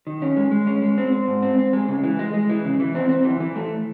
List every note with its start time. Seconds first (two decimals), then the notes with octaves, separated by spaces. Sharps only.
0.07 D#3
0.22 C#4
0.37 G#3
0.51 G#3
0.67 C#4
0.82 G#3
0.98 C4
1.12 C4
1.28 G#2
1.42 C4
1.59 C4
1.73 G#3
1.88 C#3
2.04 E3
2.19 G#3
2.34 G#3
2.49 E3
2.65 C#3
2.80 E3
2.95 C4
3.09 C4
3.24 E3
3.40 E3
3.56 A3